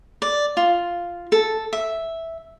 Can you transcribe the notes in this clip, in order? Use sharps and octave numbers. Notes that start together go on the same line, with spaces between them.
D5
F4
A4
E5